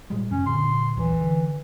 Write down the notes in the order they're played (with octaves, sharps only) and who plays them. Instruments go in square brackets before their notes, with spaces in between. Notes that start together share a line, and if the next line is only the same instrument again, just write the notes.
[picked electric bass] A#2 G3 G#3
[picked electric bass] F#2 C#3 [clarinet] C#4
[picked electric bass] A#2 D3 [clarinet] C6
[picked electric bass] A#1 D#2 F#3 [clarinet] E3
[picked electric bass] D3